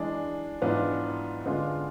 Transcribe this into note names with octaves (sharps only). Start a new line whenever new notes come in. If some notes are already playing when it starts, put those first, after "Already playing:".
Already playing: E3 G#3 D4
G#2 E3 B3 D4 F4
D3 G#3 B3 D4 F4